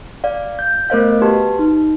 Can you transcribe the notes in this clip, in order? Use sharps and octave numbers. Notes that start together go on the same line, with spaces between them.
D5 F5
G6
A3 B3 A#4 C5 D#5 F5
F#4 G4 B4 A5 C6
D#4